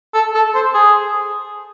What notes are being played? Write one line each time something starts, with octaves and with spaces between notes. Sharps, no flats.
A4
A4
C5
G#4